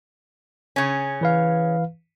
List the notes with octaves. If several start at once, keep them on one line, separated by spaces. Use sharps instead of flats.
C#3 C#4
E3 B4 F5